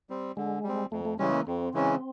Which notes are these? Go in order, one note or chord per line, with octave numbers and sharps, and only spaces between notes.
G3 C4
D3 G#3
G3 C4
F2 A3
A3
C#3 E3 G3 G#3 C#4
A#3
F2 C4
C#3 E3 G#3 C#4